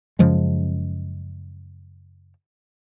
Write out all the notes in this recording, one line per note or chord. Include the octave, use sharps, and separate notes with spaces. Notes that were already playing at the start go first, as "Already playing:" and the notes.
F#2 C#3 F3 G#3